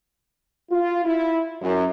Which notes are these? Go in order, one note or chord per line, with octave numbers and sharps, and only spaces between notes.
F4
E4
F#2